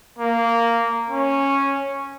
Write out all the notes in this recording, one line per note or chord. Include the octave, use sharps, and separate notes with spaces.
A#3
C#4